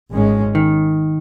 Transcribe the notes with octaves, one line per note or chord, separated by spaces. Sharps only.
G#1 G#2 G#3 C#4
D#3